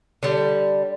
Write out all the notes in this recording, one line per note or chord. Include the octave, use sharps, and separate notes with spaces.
D3 G3